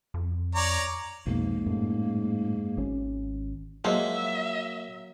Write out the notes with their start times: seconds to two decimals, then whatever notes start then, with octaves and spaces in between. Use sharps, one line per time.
0.14 F2
0.55 C#5 D5 A#5
1.26 B1 F2 G#2 A#3
1.66 F#2 A2
2.77 G#1 C#4
3.85 F3 F#3 G#3 A#3 D#5 E5